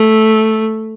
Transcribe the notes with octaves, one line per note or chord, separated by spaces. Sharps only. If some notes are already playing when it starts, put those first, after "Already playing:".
Already playing: A3